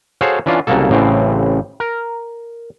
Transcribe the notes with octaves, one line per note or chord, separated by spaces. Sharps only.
F#4 G#4 A4 C5 C#5 F5
E3 C#4 D4 F4
C2 C#3 F#3 A#3 A4
A1 A2 C#3 E3 C4
A#4